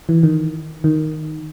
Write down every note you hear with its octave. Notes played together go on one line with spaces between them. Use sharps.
E3
D#3
D#3